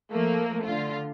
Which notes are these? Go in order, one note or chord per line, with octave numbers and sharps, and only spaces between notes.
F3 A3 A#3
D3 F4